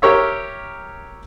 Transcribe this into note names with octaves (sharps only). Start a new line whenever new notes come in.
G4 A#4 C#5 E5